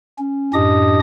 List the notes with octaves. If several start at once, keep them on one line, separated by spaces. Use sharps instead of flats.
C#4
F#2 A2 D4 G4 D#5 D#6